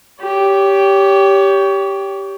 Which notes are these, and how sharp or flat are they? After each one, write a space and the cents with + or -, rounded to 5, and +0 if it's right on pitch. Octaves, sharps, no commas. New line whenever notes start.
G4 +0 C#5 +30